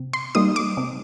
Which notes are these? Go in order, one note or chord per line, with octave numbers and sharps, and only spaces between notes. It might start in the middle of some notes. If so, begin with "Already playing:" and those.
Already playing: C3
C6
G3 A#3 D#4 D#6
D6
C3